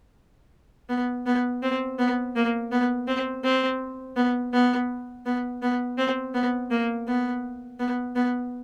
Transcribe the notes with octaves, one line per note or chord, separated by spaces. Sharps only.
B3
B3
C4
B3
A#3
B3
C4
C4
B3
B3
B3
B3
C4
B3
A#3
B3
B3
B3